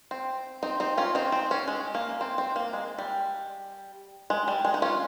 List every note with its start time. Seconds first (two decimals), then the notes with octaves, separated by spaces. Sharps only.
0.11 C4
0.63 C4 D#4
0.80 C4 D#4
0.97 C#4 F4
1.15 C4 D#4
1.32 C4
1.51 C#4
1.68 G#3
1.95 A#3
2.21 C4
2.38 C4
2.56 A#3
2.73 G#3
2.99 G3
4.30 G#3
4.48 G3
4.65 G#3
4.74 D#4
4.82 C#4 F4